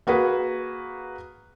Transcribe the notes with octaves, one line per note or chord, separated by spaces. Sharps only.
A#3 F#4 G#4 B4